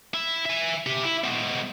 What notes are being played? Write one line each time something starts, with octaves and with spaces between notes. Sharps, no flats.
E4
E5 G#5
G4 E5
E4
G#3 B3